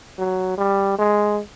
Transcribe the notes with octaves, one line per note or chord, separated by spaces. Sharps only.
F#3
G3
G#3